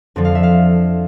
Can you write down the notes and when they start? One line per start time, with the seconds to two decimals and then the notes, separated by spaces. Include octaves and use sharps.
0.16 F2 D3 F3
0.25 F5
0.35 E5
0.43 F5